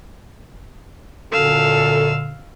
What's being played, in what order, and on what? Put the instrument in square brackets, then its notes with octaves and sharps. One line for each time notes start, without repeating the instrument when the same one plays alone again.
[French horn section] F#2 A4 [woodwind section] A#2 D3 [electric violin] F5 E6